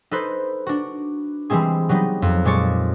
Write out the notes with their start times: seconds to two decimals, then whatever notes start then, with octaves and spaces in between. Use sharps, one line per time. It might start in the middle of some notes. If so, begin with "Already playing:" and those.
0.11 D#4 A4 B4 C5
0.66 D4 F#4
1.50 E3 G3 G#3 C4 G#4
1.89 F#3 G3 B3 D#4
2.22 F2
2.45 A#2 G#3 C#5 D5 C#7